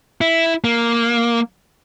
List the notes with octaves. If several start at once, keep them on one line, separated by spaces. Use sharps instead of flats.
E4
A#3